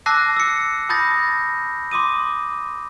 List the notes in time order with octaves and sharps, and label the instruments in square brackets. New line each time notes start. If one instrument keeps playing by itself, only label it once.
[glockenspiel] A5 D6 E6 F#6 A#6 C7
E6 C#7
A5 B5 D#6 G6 A6 A#6
C6 D6 D#6 D#7